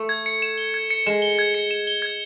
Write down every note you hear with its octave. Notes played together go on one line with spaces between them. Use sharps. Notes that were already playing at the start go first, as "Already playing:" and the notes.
Already playing: A3
G#6
C#7
E7
G7
G#6
C#7
G#3 E7
G7
G#6
C#7
E7
G7
G#6